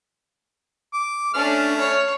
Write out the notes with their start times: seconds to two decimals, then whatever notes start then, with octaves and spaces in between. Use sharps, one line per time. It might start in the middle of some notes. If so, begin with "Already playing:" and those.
0.93 D6
1.34 A3 C#4 D4 F6
1.78 C#5